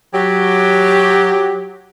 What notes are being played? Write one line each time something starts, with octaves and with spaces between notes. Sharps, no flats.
F#3 G4